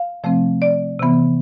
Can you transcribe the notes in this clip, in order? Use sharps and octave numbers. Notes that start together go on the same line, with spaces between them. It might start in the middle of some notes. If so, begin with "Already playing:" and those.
Already playing: F5
C3 F3 A3 C4
D5
C3 E3 B3